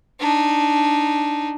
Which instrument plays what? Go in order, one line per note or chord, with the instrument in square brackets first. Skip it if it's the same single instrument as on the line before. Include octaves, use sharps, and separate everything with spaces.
[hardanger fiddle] D4 D#4